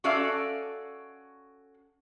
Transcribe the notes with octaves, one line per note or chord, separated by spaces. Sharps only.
C#4 F#4 A4 D5 E5 F5